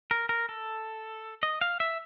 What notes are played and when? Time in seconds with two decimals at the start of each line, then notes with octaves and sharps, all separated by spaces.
0.11 A#4
0.29 A#4
0.49 A4
1.43 D#5
1.61 F5
1.80 E5